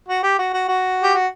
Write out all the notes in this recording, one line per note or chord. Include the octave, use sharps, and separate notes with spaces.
F#4
G4
F#4
F#4
F#4
G4
F#4